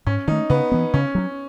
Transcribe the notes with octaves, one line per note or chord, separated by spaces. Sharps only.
G#2 C#4
D#3 A3 D#4
C#3 B3
E3 B3
C#3 C#4
F#3 C#4